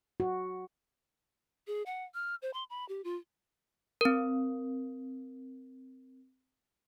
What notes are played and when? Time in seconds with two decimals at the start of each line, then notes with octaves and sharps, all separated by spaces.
0.20 F#4
1.67 G#4
1.86 F#5
2.14 F6
2.42 C5
2.54 C6
2.70 B5
2.89 G4
3.04 F4
4.01 C4 A#4